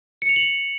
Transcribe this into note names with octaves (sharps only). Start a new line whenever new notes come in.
C#7
F7
F#7